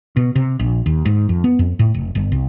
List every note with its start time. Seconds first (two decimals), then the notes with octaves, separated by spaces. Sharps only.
0.16 B2
0.35 C3
0.59 A#1
0.86 D#2
1.05 G#2
1.29 F2
1.44 B3
1.59 F2
1.79 A2
1.94 F1
2.15 G1
2.32 C2